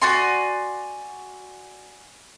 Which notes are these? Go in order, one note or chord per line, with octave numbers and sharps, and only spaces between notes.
F#4 D5 G#5 C6